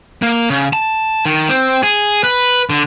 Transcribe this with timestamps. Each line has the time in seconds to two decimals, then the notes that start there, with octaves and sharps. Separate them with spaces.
0.22 A#3
0.50 C#3
0.73 A5
1.25 D#3
1.49 C4
1.83 G#4
2.24 B4
2.70 D3